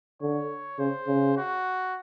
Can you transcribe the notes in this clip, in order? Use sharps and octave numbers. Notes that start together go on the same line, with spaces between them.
D3 C#5
C#3 C5
C#3
F#4